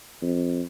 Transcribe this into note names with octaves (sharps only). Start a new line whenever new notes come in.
F2